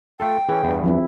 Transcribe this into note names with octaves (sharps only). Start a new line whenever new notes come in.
A3 F4 A4 G5
E3 C#4 G#4
E2 G2
F3 C4 E4